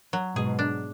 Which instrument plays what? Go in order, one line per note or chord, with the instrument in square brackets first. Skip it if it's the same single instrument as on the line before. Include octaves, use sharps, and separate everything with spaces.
[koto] F#3
[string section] G#2 B2 [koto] G#4
[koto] D4